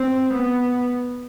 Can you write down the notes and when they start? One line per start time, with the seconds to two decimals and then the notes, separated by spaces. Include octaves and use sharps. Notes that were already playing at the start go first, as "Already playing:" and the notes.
Already playing: C4
0.33 B3